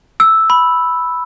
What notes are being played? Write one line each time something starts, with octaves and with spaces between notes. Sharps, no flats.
E6
B5